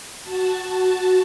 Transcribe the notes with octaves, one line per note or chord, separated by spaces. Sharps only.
F#4 A5